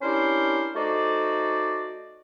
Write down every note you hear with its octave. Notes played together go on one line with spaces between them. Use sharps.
C#4 D4 E4 G4 A#4 C5
A3 D#4 F#4 C5 D5